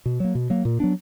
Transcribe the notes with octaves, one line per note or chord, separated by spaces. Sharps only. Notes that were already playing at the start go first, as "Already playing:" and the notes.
B2
F#3 A#3
B2
F#3 A#3
A#2
F#3 B3 D4